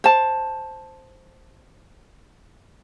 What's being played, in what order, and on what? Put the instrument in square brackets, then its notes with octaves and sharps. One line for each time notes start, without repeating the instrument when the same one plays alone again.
[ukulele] C5 A5